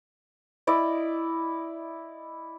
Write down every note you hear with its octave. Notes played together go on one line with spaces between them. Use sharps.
E4 D5 D#5